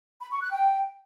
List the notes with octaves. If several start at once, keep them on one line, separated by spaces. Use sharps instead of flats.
B5
C#6
F#6
G5